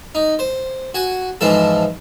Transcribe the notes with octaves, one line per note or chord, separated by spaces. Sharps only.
D#4
C5
F#4 G#5
G#2 E3 F3 A4